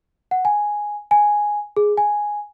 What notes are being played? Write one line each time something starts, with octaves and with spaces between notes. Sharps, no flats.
F#5
G#5
G#5
G#4
G#5